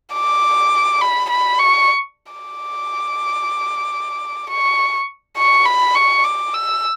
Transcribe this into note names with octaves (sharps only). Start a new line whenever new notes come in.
D6
B5
B5
C#6
D6
C#6
C#6
B5
C#6
D6
E6